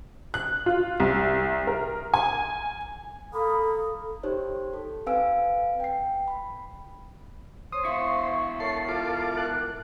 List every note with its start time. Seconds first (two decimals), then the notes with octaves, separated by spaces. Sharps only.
0.34 F#6
0.66 F4
1.00 C2
1.67 A#4
2.14 G#5
3.34 A#3 A4 B5 D#6
4.23 D#4 G4 C5 C#5
4.73 A4
5.06 C4 B4 F5 G#5 E6 D7
5.80 G5 C7
6.28 B5
7.72 C5 C#5 D#6
7.85 B2 E4 F5 C#6
8.60 A4 A#4 C#5 C7
8.89 F4 A4 D6
9.37 F#6